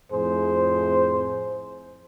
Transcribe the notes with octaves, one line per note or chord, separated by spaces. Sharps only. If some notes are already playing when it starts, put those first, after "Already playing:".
F2 A2 G#4 C5